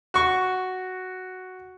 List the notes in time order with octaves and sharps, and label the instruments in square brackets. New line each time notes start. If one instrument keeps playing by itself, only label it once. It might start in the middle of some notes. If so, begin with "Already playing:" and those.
[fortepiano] F#4 C#6